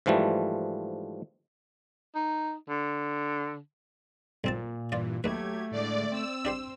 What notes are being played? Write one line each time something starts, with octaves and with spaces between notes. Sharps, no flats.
G#2 E3 F3 G3 A3
D#4
D3
B1 A#2 C4 A5
G2 E3 F4 D5
D#2 F#3 A3 G4 B4 G#6
A2 D3 G#3 D5
C4 E6
D4 G4 C5